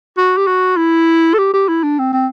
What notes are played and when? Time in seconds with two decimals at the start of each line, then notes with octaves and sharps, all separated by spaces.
0.17 F#4
0.37 G4
0.47 F#4
0.77 E4
1.34 A4
1.38 G4
1.54 G4
1.68 E4
1.83 D4
1.99 C4
2.13 C4